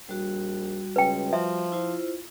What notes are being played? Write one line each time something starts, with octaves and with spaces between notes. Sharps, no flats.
A#1 G3 F#4
C#2 B4 G5
F3 E5
E4 F4 C5